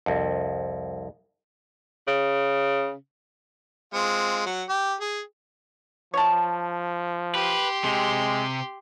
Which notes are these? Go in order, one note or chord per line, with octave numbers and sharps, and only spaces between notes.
C2 F2
C#3
G#3 C4 F4
F#3 F#5
G4
G#4
F3 C#5 A5
G4 B4 C6
C3 G#3